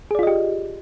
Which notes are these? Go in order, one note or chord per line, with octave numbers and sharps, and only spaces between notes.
F4 G4 G#4 D5 D#5